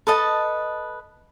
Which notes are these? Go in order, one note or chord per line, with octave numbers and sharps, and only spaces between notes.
A4 B4 D#5 A5